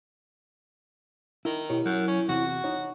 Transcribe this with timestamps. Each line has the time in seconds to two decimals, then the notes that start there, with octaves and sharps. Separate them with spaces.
1.45 D#3 E4
1.70 B2 E4 G4 C#5
1.85 F#2 F#3
2.08 C#4
2.29 E2 C3 F#4
2.64 D#4 C#5